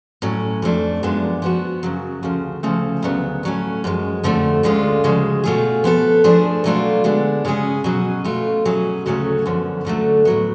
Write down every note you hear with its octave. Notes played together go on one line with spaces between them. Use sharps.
A2 F#3 C#4
F2 F3 A3 D4
F#2 F3 G#3 B3 D4
F3 B3 F#4
F#2 C#3 F#3
D2 C#3 F3
D2 C#3 F3 A3
D2 C#3 F#3 B3
A2 F#3 A3 C#4
F#2 F3 G#3
F2 D3 F3 A3
D2 D3 G#3 C#4 F4
D2 C#3 F3 G#3
B2 A3 F4 G#4
F3 B3 F#4 A4
F3 A3 D4 G#4
B2 F#3 A3 D4 F4
D3 G#3 B3 D4
C#3 G#3 C#4 G#4
B2 F#3 C#4 G#4
B2 A3 F4
B2 F#3 C#4 G#4
D2 C#3 F#3 A3 C#4
F#2 D3 F3 B3
D2 D3 F#3 A3
A2 F#3 B3